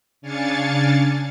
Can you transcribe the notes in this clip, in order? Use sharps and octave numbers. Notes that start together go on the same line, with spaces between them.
C#3 D4 F5 G#5 A6 C#7